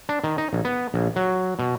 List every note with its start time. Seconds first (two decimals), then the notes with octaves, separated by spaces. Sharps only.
0.09 D4
0.24 D#3
0.38 D#4
0.53 A#1
0.65 B3
0.94 A#1
1.16 F#3
1.59 B2